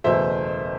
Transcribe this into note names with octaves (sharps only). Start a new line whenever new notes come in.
F#1 E2 B2 A3 C5 E5